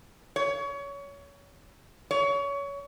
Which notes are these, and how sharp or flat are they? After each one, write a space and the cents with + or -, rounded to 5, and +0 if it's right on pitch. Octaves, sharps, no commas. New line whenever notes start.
C#5 +25
C#5 +25